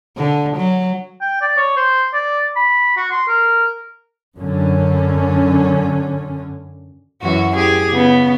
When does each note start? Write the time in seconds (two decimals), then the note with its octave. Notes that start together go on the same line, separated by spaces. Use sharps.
0.17 D3
0.57 F#3
1.21 G5
1.41 D5
1.57 C#5
1.76 C5
2.13 D5
2.56 B5
2.97 F#4
3.11 C6
3.28 A#4
4.37 F#2 D3 C#4
7.22 F#2 E3 F#4
7.56 G4 G#4
7.91 C#3 B3